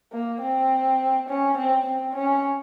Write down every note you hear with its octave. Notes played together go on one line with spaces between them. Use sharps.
A#3
C4
C#4
C4
C4
C#4